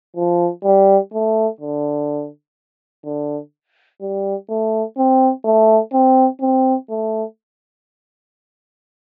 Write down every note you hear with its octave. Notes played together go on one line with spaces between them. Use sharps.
F3
G3
A3
D3
D3
G3
A3
C4
A3
C4
C4
A3